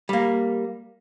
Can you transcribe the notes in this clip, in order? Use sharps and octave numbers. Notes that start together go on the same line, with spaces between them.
G3 A#3